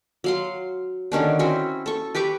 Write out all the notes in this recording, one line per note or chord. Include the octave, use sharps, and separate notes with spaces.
F#3 F5 C6
D3 D#3 C#4 D4
C4 C#4 E4 F#4
A4 C#6
G4 B4 C#6 D6